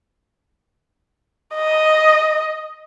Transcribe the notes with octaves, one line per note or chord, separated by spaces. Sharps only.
D#5